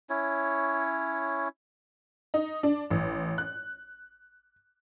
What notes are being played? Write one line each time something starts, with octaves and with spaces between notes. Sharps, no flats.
C#4 E4 C#5
D#4
D4
A1
F#6